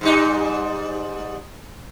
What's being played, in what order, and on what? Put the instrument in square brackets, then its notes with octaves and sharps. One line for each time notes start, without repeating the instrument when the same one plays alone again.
[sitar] G#2 G3 D#4